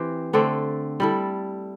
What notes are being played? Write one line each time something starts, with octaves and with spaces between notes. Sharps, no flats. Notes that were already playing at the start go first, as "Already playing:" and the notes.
Already playing: E3 C4 G4
D3 A3 C4 A4
G3 E4 A4